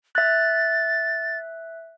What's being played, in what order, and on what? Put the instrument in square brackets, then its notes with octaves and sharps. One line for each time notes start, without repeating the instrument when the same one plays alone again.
[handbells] E5 F#6 [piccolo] A6